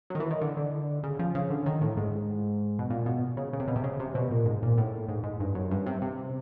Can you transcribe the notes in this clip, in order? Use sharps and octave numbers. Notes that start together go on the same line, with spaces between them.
F#3
D#3
E3
D#3
D3
D3
C#3
F3
C#3
D3
D#3
A2
G#2
B2
A#2
B2
C#3
C#3
C3
B2
C3
C#3
C3
B2
A#2
G#2
A#2
A2
G#2
G#2
G2
F#2
G2
C3
C3